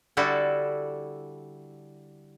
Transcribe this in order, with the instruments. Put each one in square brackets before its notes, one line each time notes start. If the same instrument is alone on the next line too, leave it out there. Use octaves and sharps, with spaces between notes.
[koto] D3 G3 E4 F#4 A4